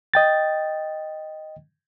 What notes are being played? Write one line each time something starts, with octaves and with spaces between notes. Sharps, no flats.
D#5 G5 A6